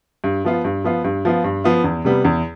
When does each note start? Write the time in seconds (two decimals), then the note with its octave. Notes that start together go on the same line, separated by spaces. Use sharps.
0.24 G2
0.45 F3 B3 F4
0.65 G2
0.84 F3 B3 F4
1.04 G2
1.25 F3 B3 F4
1.44 G2
1.64 F3 B3 F4
1.84 E2
2.05 C3 G3 B3
2.25 E2